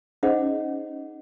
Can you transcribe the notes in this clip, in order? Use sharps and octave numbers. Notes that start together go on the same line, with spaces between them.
C#4 D#4 G#4 C5 D#5 F#5